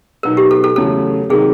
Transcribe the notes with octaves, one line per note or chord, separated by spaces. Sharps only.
B2 F#3 B3 D#4 A#4
G4
A4
A4
E2 C#3 F#3 A3 C#4 A4
C3 D#3 F#3 A#3 D#4 G#4